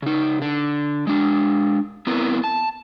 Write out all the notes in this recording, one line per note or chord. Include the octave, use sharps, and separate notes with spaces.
C#3 D#4
D3
G#3 D4
B3 C4 E4 A#4 B4
A5